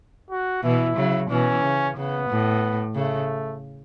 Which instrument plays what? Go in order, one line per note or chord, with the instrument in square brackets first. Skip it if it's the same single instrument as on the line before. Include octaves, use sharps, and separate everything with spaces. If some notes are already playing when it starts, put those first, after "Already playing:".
[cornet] F#4
[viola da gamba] B2 E3 [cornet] E4
[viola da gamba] C#3 F#3
[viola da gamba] B2 E3 [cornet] C#4
[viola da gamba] C#3
[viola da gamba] C#3 [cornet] B3
[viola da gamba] A2
[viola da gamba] C#3 [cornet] A3